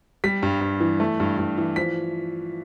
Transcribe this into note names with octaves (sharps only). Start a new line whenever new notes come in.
G3 B6
G2
G2
E3
A3
G2
G2
E3
F3 B6